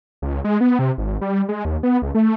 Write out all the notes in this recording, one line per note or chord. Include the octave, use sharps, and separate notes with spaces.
C#2
G#3
B3
C3
G#1
G3
G#3
D#2
B3
C#2
A3